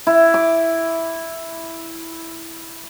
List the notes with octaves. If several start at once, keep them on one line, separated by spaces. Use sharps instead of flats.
E4
D6